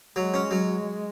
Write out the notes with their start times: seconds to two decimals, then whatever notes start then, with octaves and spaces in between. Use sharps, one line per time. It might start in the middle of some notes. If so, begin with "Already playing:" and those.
0.15 F#3 G#3
0.34 C#4
0.51 F#3